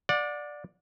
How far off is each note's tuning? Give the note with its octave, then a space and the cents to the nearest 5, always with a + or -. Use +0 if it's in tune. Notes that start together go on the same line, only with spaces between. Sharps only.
D5 +5 F#5 -35